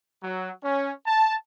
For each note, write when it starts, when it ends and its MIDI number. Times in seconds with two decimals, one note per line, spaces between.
0.23 0.50 54
0.63 0.91 61
1.06 1.35 81